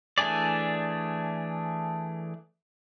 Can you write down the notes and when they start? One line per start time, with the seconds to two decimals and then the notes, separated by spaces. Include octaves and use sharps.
0.18 E3 A3 D4 G#4 D5